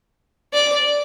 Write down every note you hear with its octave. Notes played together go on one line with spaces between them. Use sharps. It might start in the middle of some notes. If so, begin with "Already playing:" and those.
D5